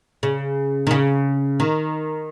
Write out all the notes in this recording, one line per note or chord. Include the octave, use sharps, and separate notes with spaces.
C#3
D#3
C#3
D#3